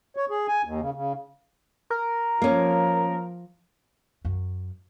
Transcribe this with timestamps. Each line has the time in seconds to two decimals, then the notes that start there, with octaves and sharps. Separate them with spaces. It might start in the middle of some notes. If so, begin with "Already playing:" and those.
0.17 C#5
0.30 G#4
0.48 G#5
0.65 D#2
0.80 C#3
0.94 C#3
1.90 A#4
2.42 F3 A#3 C#4
4.25 F#2